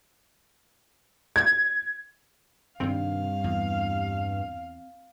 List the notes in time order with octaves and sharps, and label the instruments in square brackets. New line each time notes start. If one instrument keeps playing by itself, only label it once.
[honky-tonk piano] G#6
[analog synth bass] G2 [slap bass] C3 D#3 [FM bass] C4 [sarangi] F5
[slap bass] E2